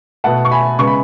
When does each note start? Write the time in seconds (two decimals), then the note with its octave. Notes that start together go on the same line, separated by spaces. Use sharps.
0.24 B2 A3 F#5 A5
0.45 C#6
0.51 G#5 B5
0.79 C#3 G#3 B3 C#6
0.87 B5